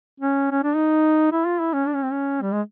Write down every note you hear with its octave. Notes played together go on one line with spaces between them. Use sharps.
C#4
C#4
D4
D#4
E4
F4
E4
C#4
D4
C#4
C4
C#4
G3
G#3